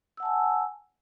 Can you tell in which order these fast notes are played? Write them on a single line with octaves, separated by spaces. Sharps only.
E6 F#5 A5 G#5